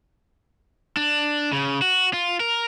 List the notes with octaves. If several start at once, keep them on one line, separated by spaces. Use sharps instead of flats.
D4
C#3
F#4
F4
A#4